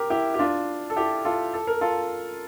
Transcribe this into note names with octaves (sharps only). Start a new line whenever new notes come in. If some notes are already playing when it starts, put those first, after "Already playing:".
Already playing: G4 A#4
E4 G4
G4
D4 F4
A4
E4 G4
F4 A4
A4
A#4
F4 A4